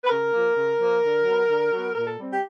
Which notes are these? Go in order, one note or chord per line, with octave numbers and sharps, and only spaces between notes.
B4
C#3 A#4
F3 A#3
C#3
F3 A#3
D3
F#3 B3
D3
F#3 B3
A#2 A#4
A4
G3 C4
G4